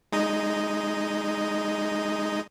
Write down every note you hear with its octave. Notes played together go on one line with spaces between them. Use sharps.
G#3 D#4 D#5